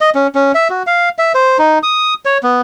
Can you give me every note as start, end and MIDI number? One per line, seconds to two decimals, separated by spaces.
0.01 0.10 75
0.15 0.27 61
0.35 0.52 61
0.55 0.68 76
0.70 0.83 66
0.87 1.09 77
1.18 1.32 76
1.35 1.58 72
1.59 1.79 63
1.83 2.14 87
2.25 2.38 73
2.43 2.61 59